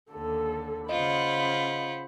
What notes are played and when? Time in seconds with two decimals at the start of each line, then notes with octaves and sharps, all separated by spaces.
0.12 D#2 D3 A4
0.89 C#3 F4 C5 D#5 F#5 B5